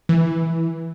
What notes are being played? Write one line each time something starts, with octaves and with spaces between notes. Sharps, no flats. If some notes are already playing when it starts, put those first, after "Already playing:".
E3